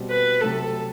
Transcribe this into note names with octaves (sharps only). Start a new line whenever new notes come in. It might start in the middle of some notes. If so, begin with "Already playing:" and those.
Already playing: B2 G3 C4
B4
C3 F#3 A3 A4